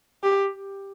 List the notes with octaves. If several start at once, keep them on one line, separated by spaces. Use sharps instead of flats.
G4